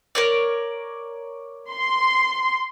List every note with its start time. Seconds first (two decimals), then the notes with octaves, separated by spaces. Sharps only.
0.15 A#4 C#5 D5
1.71 C6